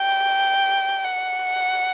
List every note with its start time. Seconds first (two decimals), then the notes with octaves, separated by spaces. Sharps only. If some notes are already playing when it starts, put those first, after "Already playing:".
Already playing: G5
1.05 F#5